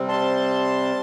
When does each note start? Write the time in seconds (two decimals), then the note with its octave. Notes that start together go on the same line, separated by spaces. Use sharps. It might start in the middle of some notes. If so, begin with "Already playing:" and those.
Already playing: C3 G3 C4
0.08 A5 C6